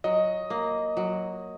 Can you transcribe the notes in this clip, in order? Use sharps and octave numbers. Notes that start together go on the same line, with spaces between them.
F#3 D#5
A#3
F#3